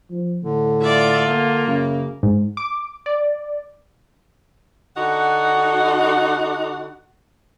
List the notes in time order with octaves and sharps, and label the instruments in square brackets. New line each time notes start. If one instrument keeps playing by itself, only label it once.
[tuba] F3
[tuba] A2 [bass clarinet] D3
[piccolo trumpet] F4 [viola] D5 E5
[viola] A#3
[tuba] F#2 [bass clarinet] C#3
[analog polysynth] G#2
D6
D5
[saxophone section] D3 D#4 F#4 F#5